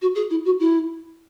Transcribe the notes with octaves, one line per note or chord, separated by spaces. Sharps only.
F#4
G#4
E4
F#4
E4